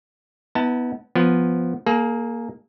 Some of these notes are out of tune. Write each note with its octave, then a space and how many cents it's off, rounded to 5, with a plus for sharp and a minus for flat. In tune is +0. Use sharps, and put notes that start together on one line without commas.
B3 +0 E4 -40 A5 +25
F3 +0 B3 +0
A#3 +0 G#4 +40